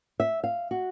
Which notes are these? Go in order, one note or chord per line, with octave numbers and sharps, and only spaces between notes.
E5
F5
F#4